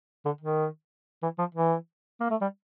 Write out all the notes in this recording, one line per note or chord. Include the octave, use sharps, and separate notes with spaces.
D3
D#3
E3
F3
E3
A#3
A3
G3